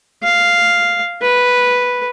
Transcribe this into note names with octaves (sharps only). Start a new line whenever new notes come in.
F5
B4